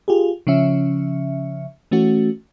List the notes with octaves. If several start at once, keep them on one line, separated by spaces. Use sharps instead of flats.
F4 G4 G#4
C#3 F3 C#4 E5
E3 A3 C#4 F#4